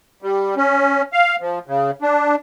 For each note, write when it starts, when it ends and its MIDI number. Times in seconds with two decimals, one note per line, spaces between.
0.22 0.55 55
0.57 1.02 61
1.13 1.36 77
1.41 1.59 53
1.67 1.91 49
2.02 2.35 62